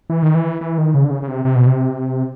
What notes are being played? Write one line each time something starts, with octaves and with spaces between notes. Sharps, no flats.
E3
D#3
E3
E3
D#3
C#3
D3
C#3
C#3
C3
C3
B2
C3